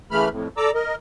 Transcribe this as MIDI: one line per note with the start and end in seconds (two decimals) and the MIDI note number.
0.11 0.29 49
0.11 0.29 52
0.11 0.29 57
0.11 0.29 83
0.11 0.29 89
0.31 0.48 41
0.31 0.48 45
0.57 0.71 69
0.57 0.71 74
0.57 0.71 82
0.57 0.71 86
0.57 0.71 88
0.75 0.95 70
0.75 0.95 75